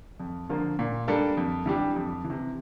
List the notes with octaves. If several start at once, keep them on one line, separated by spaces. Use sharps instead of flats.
F2
D3 F3 A#3 F4
A#2
G3 A#3 D4 A4
F2
E3 G3 D4 G4
F2
E3
C3